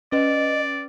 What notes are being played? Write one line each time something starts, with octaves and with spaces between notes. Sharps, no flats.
C#4 B4 D5 D#5